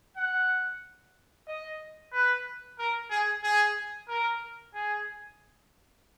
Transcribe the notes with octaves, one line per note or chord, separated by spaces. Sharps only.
F#5
D#5
B4
A#4
G#4
G#4
A#4
G#4